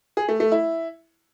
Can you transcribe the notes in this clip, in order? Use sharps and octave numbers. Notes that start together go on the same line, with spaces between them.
G#4
A3
A3
E4